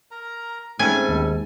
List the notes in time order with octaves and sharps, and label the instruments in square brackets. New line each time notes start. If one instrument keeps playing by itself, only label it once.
[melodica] A#4 A#5
[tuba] G#2 [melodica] G3 A4 [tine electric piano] A3 C4 C#4 [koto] G#5
[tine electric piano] D#2